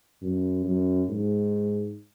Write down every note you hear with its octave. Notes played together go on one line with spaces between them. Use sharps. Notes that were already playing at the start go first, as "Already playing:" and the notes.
F#2
F#2
G#2